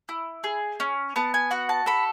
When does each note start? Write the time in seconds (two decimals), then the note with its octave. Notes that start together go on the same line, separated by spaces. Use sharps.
0.09 E4
0.44 G#4
0.80 C#4
1.16 B3 A5
1.34 G#5
1.51 F#4 F#5
1.69 A5
1.86 A4 B5